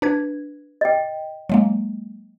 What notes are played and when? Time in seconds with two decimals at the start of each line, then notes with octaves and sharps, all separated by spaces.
0.02 D4 B4 G#6
0.81 D#5 G5
1.50 F#3 G#3 A#3